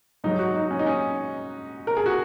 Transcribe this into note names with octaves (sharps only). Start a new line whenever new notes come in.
G#2 F#3 D#4
F#4
D#4
C#4
D#4
C#4
A#4
G#4
F#4